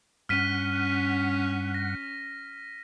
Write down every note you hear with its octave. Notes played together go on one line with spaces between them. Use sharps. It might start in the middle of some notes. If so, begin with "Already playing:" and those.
G2 C#4 F#5 F6 B6 D#7
A#6